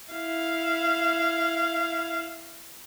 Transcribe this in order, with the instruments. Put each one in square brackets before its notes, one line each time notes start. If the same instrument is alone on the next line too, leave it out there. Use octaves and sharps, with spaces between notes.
[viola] E4 F5